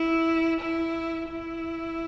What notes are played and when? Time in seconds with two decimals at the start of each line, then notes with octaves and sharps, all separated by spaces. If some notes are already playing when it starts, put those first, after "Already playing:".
Already playing: E4
0.60 E4
1.29 E4